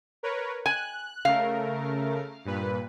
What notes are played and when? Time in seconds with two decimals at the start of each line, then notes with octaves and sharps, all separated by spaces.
0.23 A#4 B4 C#5
0.66 G#5 F#6
1.25 C#3 A3 A#4 F5
2.45 G2 A#2 B4